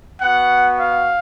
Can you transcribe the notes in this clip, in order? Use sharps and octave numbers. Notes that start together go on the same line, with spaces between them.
B3 F#4 F#5
F5